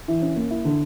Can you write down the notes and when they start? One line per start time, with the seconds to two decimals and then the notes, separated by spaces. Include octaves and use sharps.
0.08 E3
0.22 C#4
0.36 A#3
0.51 E4
0.65 D3